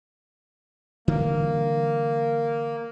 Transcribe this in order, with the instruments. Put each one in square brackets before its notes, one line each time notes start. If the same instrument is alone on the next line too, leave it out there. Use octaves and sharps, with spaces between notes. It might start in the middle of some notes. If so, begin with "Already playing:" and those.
[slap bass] D3 E3 G3 [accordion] A#3